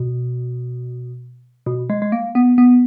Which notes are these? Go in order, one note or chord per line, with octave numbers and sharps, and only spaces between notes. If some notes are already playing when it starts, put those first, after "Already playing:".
Already playing: B2
B2
G#3
G#3
A#3
B3
B3